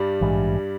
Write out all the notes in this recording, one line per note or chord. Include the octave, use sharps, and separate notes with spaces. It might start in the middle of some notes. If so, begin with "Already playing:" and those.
Already playing: G2 G3
A#1 G#2 E3 G#3